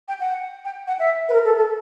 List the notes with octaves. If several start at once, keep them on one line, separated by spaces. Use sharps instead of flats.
G5
F#5
G5
F#5
E5
B4
A#4
A4
A4